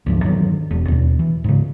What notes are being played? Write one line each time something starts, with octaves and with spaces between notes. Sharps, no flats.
D2 G#2 F3
G2 D#3 E3 F#3
E1
D#2 B2
E3
G#2 C#3